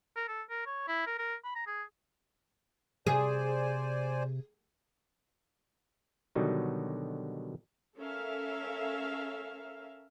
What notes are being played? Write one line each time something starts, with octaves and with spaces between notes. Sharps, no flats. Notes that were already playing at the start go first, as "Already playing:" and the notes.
A#4
A4
A#4
C#5
E4
A#4
A#4
B5
A#5
G#4
C3 G#4 C5 D5 G#5
B2 D3 D#3 F#3 G3 D#4
C#4 A4 A#4 E5 F5